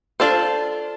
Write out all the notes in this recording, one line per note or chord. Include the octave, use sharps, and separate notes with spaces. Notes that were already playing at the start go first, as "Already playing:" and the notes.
D4 F4 A4 C5